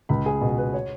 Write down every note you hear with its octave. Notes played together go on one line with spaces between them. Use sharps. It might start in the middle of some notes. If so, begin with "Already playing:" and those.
C#2 B5
G#4
B2 B3
B4
C#5